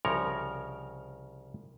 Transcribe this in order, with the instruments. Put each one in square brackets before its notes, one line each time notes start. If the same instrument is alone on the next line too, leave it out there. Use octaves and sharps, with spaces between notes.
[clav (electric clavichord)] C2 C#3 F3 A#4 C#5